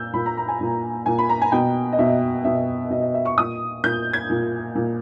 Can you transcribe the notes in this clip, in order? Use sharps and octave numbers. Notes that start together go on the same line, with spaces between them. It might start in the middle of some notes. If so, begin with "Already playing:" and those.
Already playing: A#2 E6 G6
A#2 B5
A#5
A#5
G#5
A#2
A#2 G#5
B5
A#5
G#5
B2 G5
D#5
B2 E5
B2 E5
B2 D#5
D#5
E5
C#6
A#2 D#6
A#2 G6
G#6
A#2
A#2